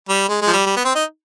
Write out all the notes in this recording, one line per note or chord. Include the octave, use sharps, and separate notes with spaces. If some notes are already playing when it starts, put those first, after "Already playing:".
G3
G#3
G#3
F3
G3
G3
B3
C4
D#4